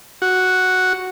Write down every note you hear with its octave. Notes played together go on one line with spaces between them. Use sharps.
F#4